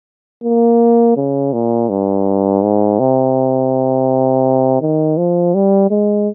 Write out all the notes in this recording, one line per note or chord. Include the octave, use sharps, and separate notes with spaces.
A#3
C#3
A#2
G2
G#2
C3
D#3
F3
G3
G#3